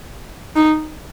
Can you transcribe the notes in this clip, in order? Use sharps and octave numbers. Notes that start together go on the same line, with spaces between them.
D#4